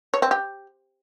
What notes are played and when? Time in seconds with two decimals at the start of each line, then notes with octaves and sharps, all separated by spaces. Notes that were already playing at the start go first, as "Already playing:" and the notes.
0.14 C#5
0.22 C4
0.31 G4